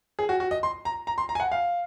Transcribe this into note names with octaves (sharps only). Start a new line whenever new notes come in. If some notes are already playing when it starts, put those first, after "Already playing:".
G#4
F#4
F#4
D#5
C6
A#5
A#5
C6
A#5
G#5
F#5
F5